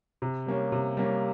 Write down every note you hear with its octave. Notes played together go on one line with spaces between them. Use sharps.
C3
G3 A#3 C#4
C3
G3 A#3 C#4